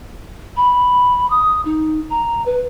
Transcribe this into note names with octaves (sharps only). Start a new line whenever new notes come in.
B5
D#6
D#4
A#5
B4